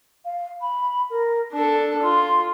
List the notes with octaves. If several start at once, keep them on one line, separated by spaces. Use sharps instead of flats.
F5
B5
A#4
D4 A4 A5
F4 C6